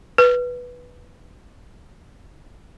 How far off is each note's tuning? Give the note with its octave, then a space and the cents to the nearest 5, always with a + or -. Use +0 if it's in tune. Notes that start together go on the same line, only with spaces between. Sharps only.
B4 -5